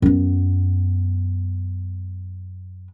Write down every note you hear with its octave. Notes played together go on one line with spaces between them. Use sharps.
F#2 B3